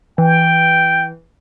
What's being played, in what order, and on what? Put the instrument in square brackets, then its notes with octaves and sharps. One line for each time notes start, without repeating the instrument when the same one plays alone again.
[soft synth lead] E3 [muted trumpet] G5